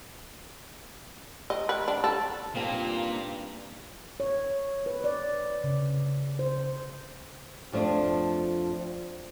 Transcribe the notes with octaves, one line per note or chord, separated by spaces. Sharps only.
D#5
B4
D4
A4
G2 A#2 A#3 C4 D#4 F4
C#5
B4
D5
C#3
C5
F2 F3 A3 D4